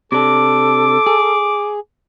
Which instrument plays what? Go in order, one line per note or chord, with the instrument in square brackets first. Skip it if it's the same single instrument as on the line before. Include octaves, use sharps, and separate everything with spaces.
[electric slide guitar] C3 D4 [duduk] A4 [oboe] D6
[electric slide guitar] G#4